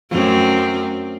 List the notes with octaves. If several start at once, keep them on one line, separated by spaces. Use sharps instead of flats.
F#2 A3 C4